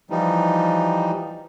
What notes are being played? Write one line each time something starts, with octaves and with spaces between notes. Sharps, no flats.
E3 F3 G3 D#4